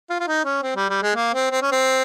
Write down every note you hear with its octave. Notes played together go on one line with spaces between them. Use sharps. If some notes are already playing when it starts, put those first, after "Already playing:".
F4
F4
D#4
C#4
C4
G3
G3
G#3
A#3
C4
C4
C#4
C4